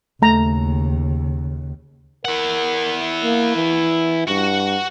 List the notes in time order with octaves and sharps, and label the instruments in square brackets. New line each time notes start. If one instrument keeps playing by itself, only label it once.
[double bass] D#2 C#3 [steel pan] A3 A#5
[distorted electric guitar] E4 F#5 [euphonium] A#4
[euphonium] A#3
E3
[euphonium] G2 [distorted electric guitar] F#4